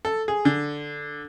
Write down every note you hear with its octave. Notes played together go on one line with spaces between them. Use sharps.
A4
G#4
D3